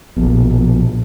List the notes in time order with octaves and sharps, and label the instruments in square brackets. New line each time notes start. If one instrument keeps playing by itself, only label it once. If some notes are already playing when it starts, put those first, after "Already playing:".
[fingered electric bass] A#1 B2